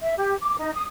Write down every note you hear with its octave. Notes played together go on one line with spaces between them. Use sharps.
E5
G4
D6
D#4
D#6